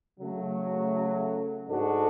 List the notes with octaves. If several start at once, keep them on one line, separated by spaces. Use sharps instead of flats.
C#3 F#3 A3
G#2 G#3 D4 F#4 A4